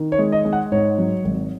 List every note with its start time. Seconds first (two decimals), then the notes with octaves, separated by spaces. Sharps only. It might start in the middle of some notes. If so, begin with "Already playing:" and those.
Already playing: D#3
0.12 C#5
0.19 G#3
0.32 D#5
0.45 G#3
0.53 F#5
0.72 G#2 C#5
0.98 F#3
1.25 G#1